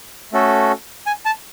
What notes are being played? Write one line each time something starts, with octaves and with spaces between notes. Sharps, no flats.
A3 C#4 F#4 A4
G#5
A5